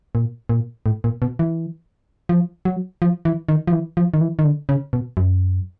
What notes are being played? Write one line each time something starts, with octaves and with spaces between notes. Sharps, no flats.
A#2
A#2
A2
A#2
B2
E3
F3
F#3
F3
E3
D#3
F3
E3
F3
D#3
E3
D#3
D3
C#3
B2
F#2